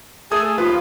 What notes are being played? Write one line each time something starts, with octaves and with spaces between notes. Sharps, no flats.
A3 G#4 A4 D#6 G#6
D#2 F3 F4 B4